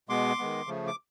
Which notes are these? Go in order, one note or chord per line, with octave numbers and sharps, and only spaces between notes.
B2 G#3 B3 C6 D6
D#3 G#3 B3
C#3 F3 A3
D6